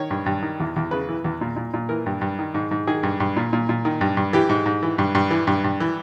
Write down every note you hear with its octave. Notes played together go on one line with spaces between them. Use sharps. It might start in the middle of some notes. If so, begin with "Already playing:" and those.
Already playing: D#3 C#5
G2
G2
D#3
E2
E2
C#3 B4
E3
E2
A#2
A#2
A#2
E3 A#4
G2
G2
D#3
G#2
G#2
D#3 G#4
G2
G2
A#2
A#2
A#2
D#3
G2
G2
E3 G4
G#2
G#2
E3
G2
G2
E3
G2
G2
E3